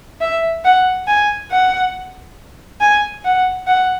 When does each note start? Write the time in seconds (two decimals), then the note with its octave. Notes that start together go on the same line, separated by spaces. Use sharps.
0.21 E5
0.64 F#5
1.07 G#5
1.51 F#5
2.81 G#5
3.24 F#5
3.67 F#5